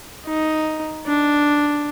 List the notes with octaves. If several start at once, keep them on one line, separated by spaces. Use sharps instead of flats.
D#4
D4